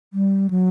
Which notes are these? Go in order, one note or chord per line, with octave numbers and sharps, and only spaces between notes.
G3
F#3